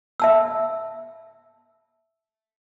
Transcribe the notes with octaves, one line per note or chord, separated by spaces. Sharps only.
E5 A5 E6